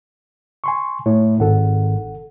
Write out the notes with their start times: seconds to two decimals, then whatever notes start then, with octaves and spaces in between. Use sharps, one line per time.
0.64 G#5 C6 C#6
1.06 A2 C#5
1.40 G#1 A4 F#5